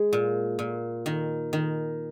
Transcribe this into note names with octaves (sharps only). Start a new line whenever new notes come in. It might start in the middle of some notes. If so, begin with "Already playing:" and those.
Already playing: G#3
A#2
A#2
D#3
D#3